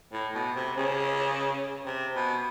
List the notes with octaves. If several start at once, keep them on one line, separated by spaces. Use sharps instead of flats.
A2
B2
C3
C#3
C3
B2